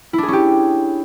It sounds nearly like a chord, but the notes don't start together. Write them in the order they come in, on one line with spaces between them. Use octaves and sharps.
E4 D4 G#4 C#4 G4